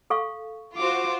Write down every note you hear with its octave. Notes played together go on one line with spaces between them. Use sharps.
A4 F5 C#6
F4 F#4 C5 D6